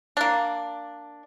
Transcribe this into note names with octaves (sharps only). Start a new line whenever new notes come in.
A#3 D4